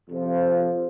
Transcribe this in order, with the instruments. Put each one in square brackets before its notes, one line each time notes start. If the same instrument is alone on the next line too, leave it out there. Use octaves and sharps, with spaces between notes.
[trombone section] F2 C3 F3